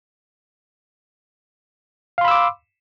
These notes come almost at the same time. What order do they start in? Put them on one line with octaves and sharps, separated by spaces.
F5 C6 B5 E6 D6